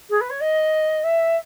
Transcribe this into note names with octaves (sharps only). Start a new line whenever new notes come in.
G#4
B4
C#5
D#5
E5